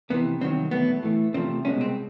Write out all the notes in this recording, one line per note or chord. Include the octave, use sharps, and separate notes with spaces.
F2 C3 E3 B3
C2 C3 D#3 F#3 C4
E2 B2 F#3 A3 B3
A2 E3 A3
E2 C3 F3 A3 C4
C2 B2 G#3 C#4
C4